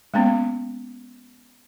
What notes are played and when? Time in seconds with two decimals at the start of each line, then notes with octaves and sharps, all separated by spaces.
0.14 G#3 A#3 B3 C#4